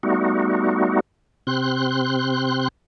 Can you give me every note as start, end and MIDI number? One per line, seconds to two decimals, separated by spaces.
0.03 1.00 55
0.03 1.00 57
0.03 1.00 59
0.03 1.00 63
0.03 1.00 66
1.47 2.68 48
1.47 2.68 60
1.47 2.68 84
1.47 2.68 90